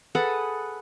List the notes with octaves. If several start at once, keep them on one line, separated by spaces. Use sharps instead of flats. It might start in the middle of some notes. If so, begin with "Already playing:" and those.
G#4 A4 B4 F#5